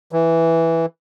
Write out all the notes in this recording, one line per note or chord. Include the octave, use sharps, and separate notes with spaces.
E3